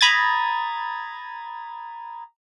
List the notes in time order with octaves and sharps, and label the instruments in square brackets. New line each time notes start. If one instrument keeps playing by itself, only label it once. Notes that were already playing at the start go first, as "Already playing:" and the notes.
[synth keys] A#5 B5 D#6 G#6 A6